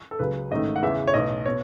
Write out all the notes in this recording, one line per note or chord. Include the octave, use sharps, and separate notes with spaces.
A4
C#2 C#3 F#3 B4
A1 G#2 D#3 A3 D#5
F#5
E2 C#3 E3 E5
C#5
B1 A2 E3 D#5
B2 C#5